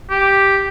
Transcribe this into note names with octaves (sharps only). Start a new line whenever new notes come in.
G4